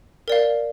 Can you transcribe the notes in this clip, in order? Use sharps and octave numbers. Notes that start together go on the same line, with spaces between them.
A#4 D5 F5